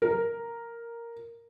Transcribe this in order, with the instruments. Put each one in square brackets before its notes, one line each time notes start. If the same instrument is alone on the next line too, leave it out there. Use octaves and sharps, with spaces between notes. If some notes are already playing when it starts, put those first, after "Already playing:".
[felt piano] A#4